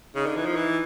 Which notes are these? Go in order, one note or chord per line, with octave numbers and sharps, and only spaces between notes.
C#3 D#4
D3
E3
F3
E3